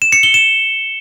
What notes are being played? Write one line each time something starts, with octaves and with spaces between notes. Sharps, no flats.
E7
C#7
G7
E7